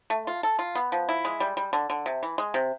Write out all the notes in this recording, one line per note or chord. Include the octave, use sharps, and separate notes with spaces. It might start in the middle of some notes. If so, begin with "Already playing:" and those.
A3
F4
A4
F4
B3
F3
E4
G#3
G3
G3
D3
D3
C3
E3
G#3
C3